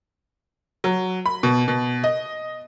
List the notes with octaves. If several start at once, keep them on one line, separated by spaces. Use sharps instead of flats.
F#3
B5
B2
B2
D#5